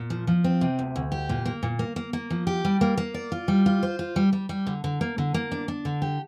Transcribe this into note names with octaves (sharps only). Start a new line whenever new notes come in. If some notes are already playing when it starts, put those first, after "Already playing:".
Already playing: A#2
F3
F3
C4
C3
D2
D2
G4
A#2
A#3
A#2
A#3
A#3
A#3
F3
G4
G3
A#3
A#3
D5
F4
G3
F4
C5
F4
G3
G3
G3
D3
D3
A#3
D3
A#3
D4
D4
D3
G4